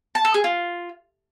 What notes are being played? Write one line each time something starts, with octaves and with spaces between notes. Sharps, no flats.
A5
A4
G#4
F4